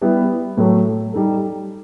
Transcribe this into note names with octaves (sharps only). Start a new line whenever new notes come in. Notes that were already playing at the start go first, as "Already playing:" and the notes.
G3 B3 E4 B4
A2 F#3 A3
G3 D#4 A4